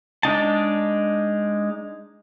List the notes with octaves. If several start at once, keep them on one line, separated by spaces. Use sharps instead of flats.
G#3 D4 D#4 A5